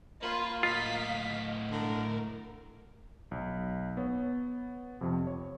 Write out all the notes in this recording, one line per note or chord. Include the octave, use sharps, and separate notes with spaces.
A#3 F4 B4
A2 F4 D#5 F5 B6
D3 A#4
B1
B3 C#5
F2 C3 F3
C#5